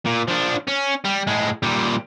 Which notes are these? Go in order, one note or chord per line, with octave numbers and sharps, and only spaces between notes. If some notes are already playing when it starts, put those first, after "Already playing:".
A#2
F3 D4
C#4
G3
A2 G#3
A#2 G3